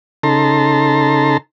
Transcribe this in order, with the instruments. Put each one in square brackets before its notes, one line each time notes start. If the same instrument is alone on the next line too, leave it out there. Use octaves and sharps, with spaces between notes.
[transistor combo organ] C#3 D#4 A4 A5 A#5 C6